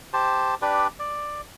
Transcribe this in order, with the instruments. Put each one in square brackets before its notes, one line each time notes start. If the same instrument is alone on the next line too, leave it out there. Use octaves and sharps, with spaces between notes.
[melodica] G4 C5 A5
D4 G4 B4 D5
D5